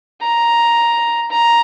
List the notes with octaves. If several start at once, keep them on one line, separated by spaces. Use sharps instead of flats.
A#5
A#5